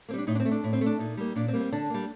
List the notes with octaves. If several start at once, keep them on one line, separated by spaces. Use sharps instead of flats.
A#3 C4
G3 D4
A2 D#4
D4
C4
A3
D4
A2
C4
A3
D4
A#2 D#4
G3 A#3
A#2 D4
C4
G3 A#3
C4
D3 D4
G3 A#3